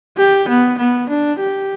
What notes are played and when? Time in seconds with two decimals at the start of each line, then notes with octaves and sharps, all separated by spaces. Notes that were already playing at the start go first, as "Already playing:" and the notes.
0.18 G4
0.49 B3
0.79 B3
1.10 D4
1.40 G4